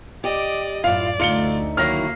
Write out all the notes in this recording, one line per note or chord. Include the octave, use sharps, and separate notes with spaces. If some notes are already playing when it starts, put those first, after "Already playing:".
G4 D5 D#5
F#2 A2 E4 F4 D5 F5
D2 D3 A3 D#4 F4 C#7 G7
D#3 F#3 A#3 E4 F6 A#6 C7